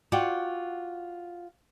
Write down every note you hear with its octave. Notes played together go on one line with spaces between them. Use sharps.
F4 F#4 D5 F#5 G5